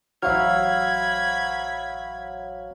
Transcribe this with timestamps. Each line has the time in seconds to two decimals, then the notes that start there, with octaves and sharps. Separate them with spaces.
0.22 A1 F#3 C5 E5 F5 B5 F6 G#6